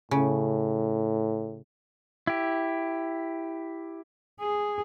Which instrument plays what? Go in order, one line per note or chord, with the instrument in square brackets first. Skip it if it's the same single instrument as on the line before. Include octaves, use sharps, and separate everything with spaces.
[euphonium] A2 [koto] C#3
[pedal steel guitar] E4 G4
[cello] G#4